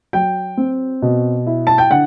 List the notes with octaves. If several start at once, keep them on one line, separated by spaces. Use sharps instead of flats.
F#3 G5
C4
B2
E4
A5
G5
D3 F#5